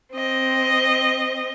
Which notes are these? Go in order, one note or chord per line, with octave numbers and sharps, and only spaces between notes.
C4 D#5